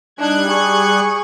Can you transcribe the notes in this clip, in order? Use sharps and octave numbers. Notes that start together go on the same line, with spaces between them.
G3 D4 D#4 F#6 G#6
G#4 C#6